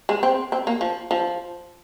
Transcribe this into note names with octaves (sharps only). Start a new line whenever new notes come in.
G#3
C4
C4
A#3
F3
F3